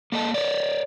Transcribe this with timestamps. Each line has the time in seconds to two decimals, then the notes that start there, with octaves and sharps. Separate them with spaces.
0.12 A#3 A4 D#5 A5
0.34 A#4 C#5 D5